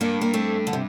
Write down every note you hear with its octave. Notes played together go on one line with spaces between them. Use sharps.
G2 A#3 D4
A#3
A3 C4
D3
C3